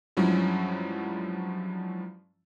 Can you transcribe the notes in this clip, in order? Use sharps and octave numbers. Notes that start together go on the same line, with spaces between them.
G2 F3 F#3 G#3 C#4 E4